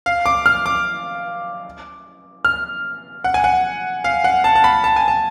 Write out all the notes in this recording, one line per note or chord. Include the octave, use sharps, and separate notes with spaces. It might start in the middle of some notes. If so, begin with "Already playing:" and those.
F5
D6
F6
D6
F6
F#5
G#5
F#5
F5
F#5
A5
A5
B5
A5
G#5
A5